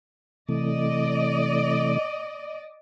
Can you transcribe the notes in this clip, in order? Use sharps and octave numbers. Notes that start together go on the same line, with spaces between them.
C3 E3 A3 D5 D#5